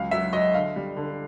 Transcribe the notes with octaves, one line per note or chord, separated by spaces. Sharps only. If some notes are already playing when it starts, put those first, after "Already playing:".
Already playing: C#2 F#3 F5
F#3 E5
F#3 D#5
D3 F5
G3
D3